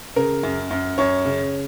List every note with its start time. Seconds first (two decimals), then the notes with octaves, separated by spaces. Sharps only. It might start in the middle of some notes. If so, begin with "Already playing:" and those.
0.16 C#3 A#4
0.43 F#2
0.71 F#2
0.98 F#2 C#5
1.25 C#3